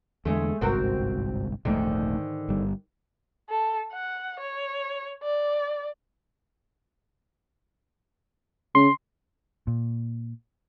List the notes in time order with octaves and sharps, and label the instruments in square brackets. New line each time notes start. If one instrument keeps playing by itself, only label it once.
[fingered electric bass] E2 D3 [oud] G#3 A3
[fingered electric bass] G1 C2 G#2 [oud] C4 F#4 A#4
[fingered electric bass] D#1 A#1 A3 [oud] G#2 D3 D#3
[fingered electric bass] G1 G3
[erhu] A4
F#5
C#5
D5
[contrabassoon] C#3 [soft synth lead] C6
[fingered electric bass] A#2